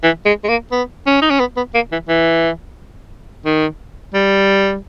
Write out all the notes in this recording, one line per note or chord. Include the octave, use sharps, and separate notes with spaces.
E3
G#3
G#3
A#3
B3
C#4
D#4
C#4
B3
B3
A#3
E3
E3
D#3
G3